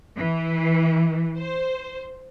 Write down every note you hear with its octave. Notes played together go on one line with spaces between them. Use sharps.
E3
C5